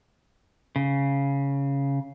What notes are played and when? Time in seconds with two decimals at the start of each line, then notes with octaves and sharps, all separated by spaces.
0.76 C#3